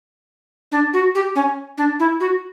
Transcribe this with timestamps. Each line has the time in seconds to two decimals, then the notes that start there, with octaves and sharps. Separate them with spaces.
0.72 D4
0.93 F#4
1.15 G4
1.35 C#4
1.78 D4
1.99 E4
2.20 F#4